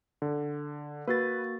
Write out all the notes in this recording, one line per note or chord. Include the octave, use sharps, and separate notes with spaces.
D3
A#3 F#4 B4 A6